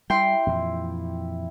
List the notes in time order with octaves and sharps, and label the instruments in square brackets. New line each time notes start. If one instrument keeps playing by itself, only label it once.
[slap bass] G3 [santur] E4 G4 [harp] G5 C6
[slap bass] F2 A#2 E3